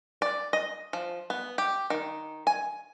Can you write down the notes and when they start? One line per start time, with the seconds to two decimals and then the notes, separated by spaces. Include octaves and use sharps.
0.22 D5
0.53 D#5
0.93 F3
1.30 B3
1.58 G4
1.90 D#3
2.47 G#5